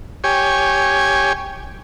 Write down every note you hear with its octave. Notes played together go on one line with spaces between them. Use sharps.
G4 C#5 G#5